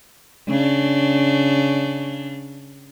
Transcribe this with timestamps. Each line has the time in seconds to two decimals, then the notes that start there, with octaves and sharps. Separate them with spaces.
0.48 C#3 D4